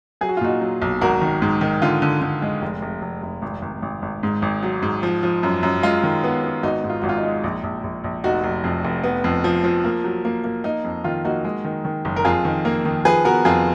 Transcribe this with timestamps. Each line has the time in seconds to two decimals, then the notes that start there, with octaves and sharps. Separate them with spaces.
0.21 F#3 G#4
0.29 F#4
0.37 F4
0.41 A#2 D#4 F#4
0.61 F#3
0.82 B1
1.01 G#1 F#4 A#4
1.21 D#3
1.42 G#2
1.61 D#3
1.82 D3 F4
2.02 D3
2.22 D3
2.42 G#3
2.62 F1
2.82 F1
3.02 F1
3.22 F1
3.42 G#1
3.62 G#1
3.82 G#1
4.02 G#1
4.23 G#2
4.42 G#1
4.63 F#3
4.82 G#2
5.03 F3
5.23 F3
5.43 F#2
5.63 F#2
5.83 G#3 F4
6.03 D#3
6.24 B3
6.44 B3
6.63 G#1 D#4 F#4
6.84 G#2
6.90 F4
7.02 G#1 F#4
7.09 F4
7.17 D#4
7.24 G#3
7.44 A#1
7.63 A#1
7.84 A#1
8.04 A#1
8.24 F1 D#4 F#4
8.44 F1
8.64 F2
8.85 F1
9.04 B3
9.24 F2
9.44 F3
9.64 F3
9.84 A#3
10.04 F#3
10.25 A#3
10.44 A#3
10.64 A#3 D#4
10.84 F2
11.04 D#3 F4
11.24 A#3 D#4 F#4
11.44 G#3
11.65 D#3
11.85 D#3
12.05 F#1
12.16 A#4
12.25 F2 F4 G#4
12.45 D#3
12.65 A#3
12.85 D#3
13.05 F3 G#4 B4
13.25 B3 F#4 A#4
13.45 F2 F4 G#4